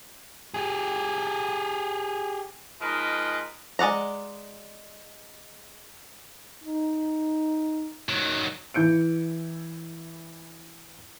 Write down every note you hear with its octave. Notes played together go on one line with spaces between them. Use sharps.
G4 G#4
F3 G#3 D#4 A#4 B4 D#5
G#3 D5 F#5 A#5
D#4
D#3 F#3
E3 E4 G6 C#7 D7